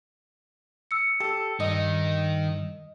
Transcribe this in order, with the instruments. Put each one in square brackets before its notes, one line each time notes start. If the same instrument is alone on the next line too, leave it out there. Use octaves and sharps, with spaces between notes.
[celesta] E6 C#7
[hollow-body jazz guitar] G4 [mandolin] A4
[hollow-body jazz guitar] G2 [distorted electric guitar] D#3 D#4 [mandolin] D#5